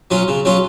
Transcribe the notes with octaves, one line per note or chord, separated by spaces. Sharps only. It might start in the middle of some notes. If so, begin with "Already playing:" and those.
F#3 C#4 F4
C#3
F#3 C#4 F4